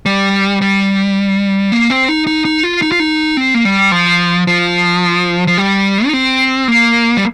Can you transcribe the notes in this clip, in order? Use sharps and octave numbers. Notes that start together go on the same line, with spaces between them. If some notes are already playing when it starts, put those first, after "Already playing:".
G3
G3
A#3
C4
D#4
D#4
D#4
F4
D#4
F4
D#4
C4
A#3
G3
F3
F3
F3
G3
D#4
C4
A#3
G3